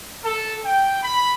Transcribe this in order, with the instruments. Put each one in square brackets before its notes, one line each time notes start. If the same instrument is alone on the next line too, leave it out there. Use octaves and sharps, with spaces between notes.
[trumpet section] A4
G5
B5